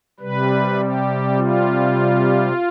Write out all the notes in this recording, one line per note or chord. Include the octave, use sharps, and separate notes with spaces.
C3 G3 B4
G4
F4